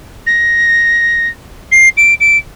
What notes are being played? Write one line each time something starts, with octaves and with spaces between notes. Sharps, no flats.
A#6
C7
D7
D7